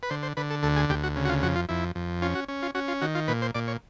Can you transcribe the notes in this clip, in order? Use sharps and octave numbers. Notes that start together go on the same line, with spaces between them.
B4
D3 C5
C5
D3 B4
A4
D2 A4
G#4
D2 G4
F#4
C#3
F#4
F4
F2 F#4
F4
F2 E4
F2
C#4 F4
F#4
C#4
F4
C#4 F#4
F4
D#3 F#4
F4
A#2 B4
C5
A#2 D5
C#5